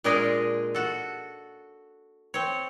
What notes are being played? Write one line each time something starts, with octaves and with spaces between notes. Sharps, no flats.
A#2 G#3 D4 G#4 A#4 D#5
F#4 A4
C4 C#5